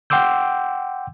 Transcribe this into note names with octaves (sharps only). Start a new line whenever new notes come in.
F#5 G5 C6 D6 E6 G6